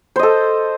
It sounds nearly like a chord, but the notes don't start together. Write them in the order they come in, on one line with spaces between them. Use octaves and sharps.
C5 D#5 A4